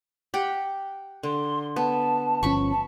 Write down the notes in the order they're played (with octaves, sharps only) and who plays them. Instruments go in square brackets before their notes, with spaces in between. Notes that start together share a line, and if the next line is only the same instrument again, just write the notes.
[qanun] G4 F#5 G5
[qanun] D3 [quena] C6
[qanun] B3 [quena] A5
[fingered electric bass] G1 F3 C#4 [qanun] B5 C#6
[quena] A5